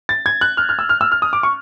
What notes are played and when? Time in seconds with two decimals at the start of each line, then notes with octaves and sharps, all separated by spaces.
0.09 A6
0.26 G#6
0.41 F#6
0.57 F6
0.69 F6
0.79 E6
0.89 F6
1.01 E6
1.12 F6
1.22 D#6
1.33 D6
1.43 C#6